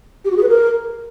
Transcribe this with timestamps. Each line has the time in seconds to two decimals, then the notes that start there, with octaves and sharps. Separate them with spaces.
0.25 G4
0.31 F#4
0.37 G#4
0.43 B4
0.49 A#4